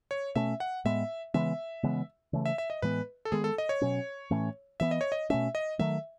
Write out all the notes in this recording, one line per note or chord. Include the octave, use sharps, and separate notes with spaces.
C#5
B2 A3 C#4 E5
F#5
A2 G#3 B3 E5
C#3 E3 G#3 B3 E5
C#3 E3 G#3 B3
C#3 E3 A3
E5
E5
D#5
A2 E3 G#3 B3 B4
A4
D#3 G#3 B3 G#4
A4
D#5
C#5
B2 F#3 C#4
A2 E3 A3 C#4
E3 B3 E5
D#5
C#5
D#5
B2 A3 C#4 E5
D#5
D#3 F#3 A3 E5